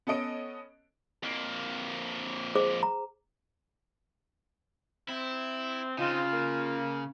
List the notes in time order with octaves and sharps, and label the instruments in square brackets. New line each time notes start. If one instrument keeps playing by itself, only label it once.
[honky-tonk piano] B3 C#4 A4 D#5 D7
[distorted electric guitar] F2 A#3
[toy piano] G#4 C5 D6
A#5
[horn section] C4 [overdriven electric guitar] E4
[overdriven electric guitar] C#3 [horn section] C4 D#4 [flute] F4
[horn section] A#3